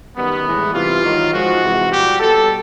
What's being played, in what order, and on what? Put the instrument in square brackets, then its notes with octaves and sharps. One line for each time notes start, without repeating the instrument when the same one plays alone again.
[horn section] F#2 D#3 G3 B3
A2 E3 G#3
C3 E3 G3 F4
G#2 D#3 F#3
G#2 F3 G#3 F#4
C3 E3 G#3
A#2 G3 G4
B2 G3 A4